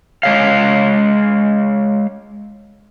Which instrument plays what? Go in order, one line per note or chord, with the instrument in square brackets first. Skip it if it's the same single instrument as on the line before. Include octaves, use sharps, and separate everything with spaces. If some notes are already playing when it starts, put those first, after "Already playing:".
[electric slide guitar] G#3 C#5 F5